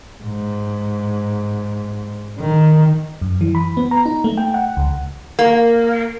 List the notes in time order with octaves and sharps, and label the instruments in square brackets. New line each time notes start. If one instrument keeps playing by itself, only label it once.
[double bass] G#2
D#3
[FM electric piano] F#2
E3
B5
B3
A#5
D#4
A3
G5
F#5
C#2
[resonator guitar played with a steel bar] A#3